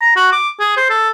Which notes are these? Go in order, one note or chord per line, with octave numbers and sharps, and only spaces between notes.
A#5
F#4
D6
G#4
C5
A4